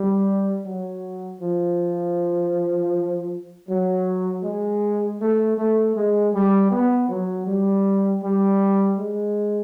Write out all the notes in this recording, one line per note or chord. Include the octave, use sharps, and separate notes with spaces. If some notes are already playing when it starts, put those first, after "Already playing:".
Already playing: G3
F#3
F3
F#3
G#3
A3
A3
G#3
G3
B3
F#3
G3
G3
G#3